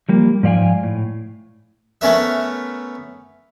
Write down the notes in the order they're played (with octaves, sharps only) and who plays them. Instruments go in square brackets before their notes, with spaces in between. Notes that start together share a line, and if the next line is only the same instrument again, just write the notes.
[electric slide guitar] F3 G3 A#3
G#2 F3 D5 F5 G5 G#5
A2
[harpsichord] A3 B3 C#4 A#4 E5